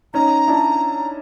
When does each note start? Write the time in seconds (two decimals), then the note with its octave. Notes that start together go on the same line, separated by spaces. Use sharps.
0.14 C#4 D#4 A#5
0.48 D4 E4